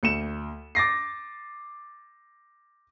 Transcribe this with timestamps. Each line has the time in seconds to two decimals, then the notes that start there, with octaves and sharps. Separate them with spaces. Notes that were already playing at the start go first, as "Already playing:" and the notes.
0.03 D2 C#7 E7
0.75 D6 A6 A#6 C7